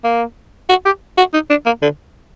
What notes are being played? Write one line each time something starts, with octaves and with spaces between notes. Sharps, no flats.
A#3
F#4
G4
F#4
D#4
D4
A#3
D3